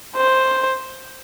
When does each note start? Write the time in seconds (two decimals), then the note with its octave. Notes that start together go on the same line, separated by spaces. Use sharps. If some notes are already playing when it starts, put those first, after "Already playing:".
0.16 C5